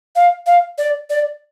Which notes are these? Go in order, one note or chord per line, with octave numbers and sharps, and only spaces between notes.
F5
F5
D5
D5